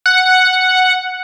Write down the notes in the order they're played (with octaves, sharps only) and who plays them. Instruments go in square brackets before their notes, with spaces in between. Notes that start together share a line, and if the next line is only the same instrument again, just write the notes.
[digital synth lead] F#5